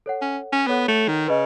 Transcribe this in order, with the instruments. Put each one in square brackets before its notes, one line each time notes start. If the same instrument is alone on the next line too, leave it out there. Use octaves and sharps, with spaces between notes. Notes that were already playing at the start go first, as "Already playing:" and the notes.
[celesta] A4 C#5 F#5
[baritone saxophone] C#4
C#4
[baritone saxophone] B3 [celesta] A4 C#5 F#5
[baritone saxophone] A3
D#3
[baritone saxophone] C#3 [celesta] B4 D#5